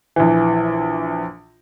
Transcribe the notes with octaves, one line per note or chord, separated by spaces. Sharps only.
A#1 E3